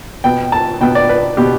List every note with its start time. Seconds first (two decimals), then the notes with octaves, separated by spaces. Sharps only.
0.24 B2 B3 G5
0.52 A5
0.81 B2 B3 G5
0.95 D5
1.09 B4
1.37 B2 B3 G4